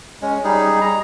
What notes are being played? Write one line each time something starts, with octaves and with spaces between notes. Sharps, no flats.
G#3 C#4
G3 D#4 G#4
A#5